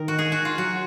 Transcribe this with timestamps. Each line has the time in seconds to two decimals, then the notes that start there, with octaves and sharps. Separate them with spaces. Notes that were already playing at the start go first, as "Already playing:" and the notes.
Already playing: D#3 A#4
0.08 F#4
0.19 G#4
0.32 F#4
0.45 F4
0.58 F#3 F#4